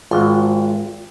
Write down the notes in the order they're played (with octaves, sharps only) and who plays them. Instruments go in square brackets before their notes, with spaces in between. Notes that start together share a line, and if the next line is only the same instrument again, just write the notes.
[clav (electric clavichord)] G#1 [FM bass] F4